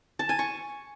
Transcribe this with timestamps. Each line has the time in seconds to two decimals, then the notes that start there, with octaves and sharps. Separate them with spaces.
0.19 A5
0.29 G#5
0.39 C#6